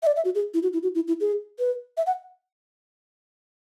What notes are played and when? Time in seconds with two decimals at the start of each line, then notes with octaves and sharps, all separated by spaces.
0.03 E5
0.07 D5
0.16 E5
0.25 F#4
0.35 G#4
0.54 E4
0.63 F#4
0.73 E4
0.83 F#4
0.95 E4
1.08 E4
1.20 G#4
1.59 B4
1.97 E5
2.07 F#5